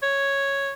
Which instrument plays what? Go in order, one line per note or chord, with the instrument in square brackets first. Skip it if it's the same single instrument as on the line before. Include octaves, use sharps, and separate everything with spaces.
[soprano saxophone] C#5